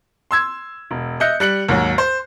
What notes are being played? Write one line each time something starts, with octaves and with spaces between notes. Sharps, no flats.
C6 E6 G#6
E1
D#5 E5 F#6 G6 C#7
G3 F#6 C#7 F#7
D#2 G#2 F#3
C5